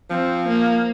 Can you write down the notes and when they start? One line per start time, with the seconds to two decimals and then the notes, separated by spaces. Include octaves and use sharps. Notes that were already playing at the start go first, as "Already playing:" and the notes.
0.10 F3 C4
0.48 A#3